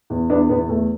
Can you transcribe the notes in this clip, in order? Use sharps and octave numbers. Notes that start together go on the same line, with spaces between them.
E2
E2 B3 D4
E2 B3
E2 A3